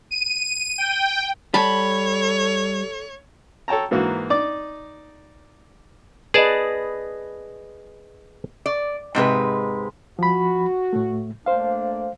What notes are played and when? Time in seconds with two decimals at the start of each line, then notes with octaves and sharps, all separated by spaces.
0.11 D#7
0.78 G5
1.54 G3 A4 C#5 A5 B5
3.68 A4 C#5 G5 A5 A#5
3.91 G#2 E3 A#3 F#4
4.30 D#4 D5 D6
6.34 G#4 B4 D5 D#5 A5
8.66 D5
9.15 G#2 C3 G#3 B4
10.19 F3 F#4 B5
10.93 A2 A3
11.46 A3 A#3 D4 C5 F5